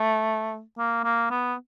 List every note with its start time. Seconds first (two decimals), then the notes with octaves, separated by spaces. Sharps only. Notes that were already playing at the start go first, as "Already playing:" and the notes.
Already playing: A3
0.78 A#3
1.04 A#3
1.31 B3